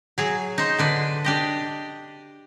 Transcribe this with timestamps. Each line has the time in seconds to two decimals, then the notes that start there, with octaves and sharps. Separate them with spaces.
0.18 F#3 G#4
0.58 D#4 C5
0.79 D3 D4 B4
1.24 D4 G4 D#5